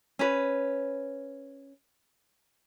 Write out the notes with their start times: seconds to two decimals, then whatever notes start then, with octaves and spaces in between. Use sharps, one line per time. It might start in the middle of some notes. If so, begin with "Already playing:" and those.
0.19 C#4 B4